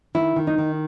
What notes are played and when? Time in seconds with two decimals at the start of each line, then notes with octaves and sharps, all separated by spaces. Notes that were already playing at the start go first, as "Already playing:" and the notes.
0.15 D#3 E4
0.36 D#3
0.47 D#4
0.58 D#3